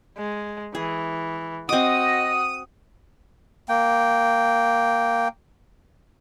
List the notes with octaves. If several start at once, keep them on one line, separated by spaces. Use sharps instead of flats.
G#3
E3 G#4
C4 F#4 D#5 D6 D#6
A#3 G5